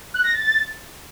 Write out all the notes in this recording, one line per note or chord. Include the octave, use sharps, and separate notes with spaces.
F#6
A#6
A6